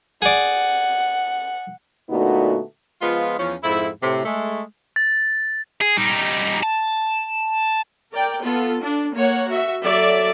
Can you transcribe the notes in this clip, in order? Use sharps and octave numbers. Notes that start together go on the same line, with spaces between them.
G#4 D5 F#5
A#2 D3 A3 B3 D#4 F#4
F3 G#3 B3 F4
E2 F3 C#4
F2 G#2 E4
A2 C3
G#3 A3
A6
G#4
G3 D#4
A5
A#4 D5 G5
B3 F4 A4
D4
A#3 C#5 F#5
F#4 E5
F#3 A4 D5 E5